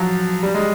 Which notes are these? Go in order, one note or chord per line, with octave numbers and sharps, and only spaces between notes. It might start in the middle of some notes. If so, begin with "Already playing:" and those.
Already playing: F3 F#3
G3
G#3